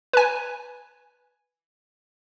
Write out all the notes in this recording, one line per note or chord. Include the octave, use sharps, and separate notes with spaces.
B4 G#5